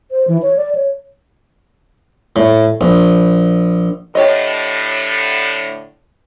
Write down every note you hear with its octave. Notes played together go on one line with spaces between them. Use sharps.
C5
E3
C#5
D5
C#5
A2
A#1
A2 D3 G4 C#5 D#5